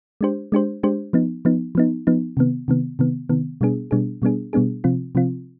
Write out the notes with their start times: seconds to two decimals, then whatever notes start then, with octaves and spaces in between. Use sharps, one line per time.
0.21 G#3 D4 G4 C5
0.52 G#3 D4 G4 C5
0.83 G#3 D4 G4 C5
1.13 F3 B3 D#4
1.45 F3 B3 D#4
1.75 F3 B3 D#4
2.07 F3 B3 D#4
2.37 C3 D#3 B3
2.68 C3 D#3 B3
2.99 C3 D#3 B3
3.29 C3 D#3 B3
3.61 B2 G3 B3 D4 G#4
3.91 B2 G3 B3 D4 G#4
4.22 B2 G3 B3 D4 G#4
4.53 B2 G3 B3 D4 G#4
4.84 C3 F3 C4 F4
5.15 C3 F3 C4 F4